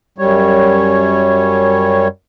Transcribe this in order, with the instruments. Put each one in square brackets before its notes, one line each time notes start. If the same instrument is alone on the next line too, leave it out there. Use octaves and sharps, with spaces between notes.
[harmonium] F#2 G3 C#5